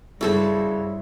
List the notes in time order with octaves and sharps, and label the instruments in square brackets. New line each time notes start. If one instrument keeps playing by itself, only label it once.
[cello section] G2 [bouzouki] C#3 F#3 [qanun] E4 A4 C5